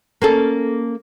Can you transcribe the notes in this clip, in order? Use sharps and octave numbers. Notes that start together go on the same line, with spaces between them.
A#3 C#4 A4